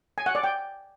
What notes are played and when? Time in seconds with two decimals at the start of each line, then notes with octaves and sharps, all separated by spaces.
0.18 G#5
0.26 F#5
0.35 D5
0.44 G5